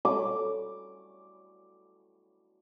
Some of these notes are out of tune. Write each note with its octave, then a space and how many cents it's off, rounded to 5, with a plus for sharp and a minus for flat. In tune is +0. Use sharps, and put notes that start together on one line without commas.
D6 +0